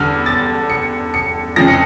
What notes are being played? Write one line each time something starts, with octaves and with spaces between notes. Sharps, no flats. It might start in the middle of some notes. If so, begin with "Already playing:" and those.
Already playing: E2 D3 G3 F6
A6
C#7
C#7
F1 F2 C#3 F3 A#6
C#7